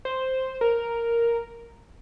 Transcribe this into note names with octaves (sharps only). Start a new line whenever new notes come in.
C5
A#4